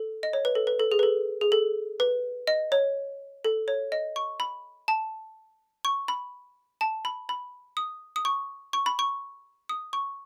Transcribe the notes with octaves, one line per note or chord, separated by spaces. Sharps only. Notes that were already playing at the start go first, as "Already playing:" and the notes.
Already playing: A4
D#5
C#5
B4
A4
B4
A4
G#4
B4
A4
G#4
A4
B4
D#5
C#5
A4
C#5
D#5
C#6
B5
A5
C#6
B5
A5
B5
B5
D#6
D#6
C#6
C#6
B5
C#6
D#6
C#6